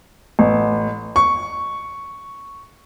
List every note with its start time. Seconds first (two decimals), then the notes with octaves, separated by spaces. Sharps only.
0.39 A1
1.16 C#6